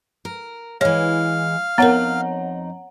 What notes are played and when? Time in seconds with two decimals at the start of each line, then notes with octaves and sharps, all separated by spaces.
0.25 A#4
0.81 E3 G#3 C#5 F5
1.78 F2 G#2 B3 D#4 A#4 C#5 F#5 A#5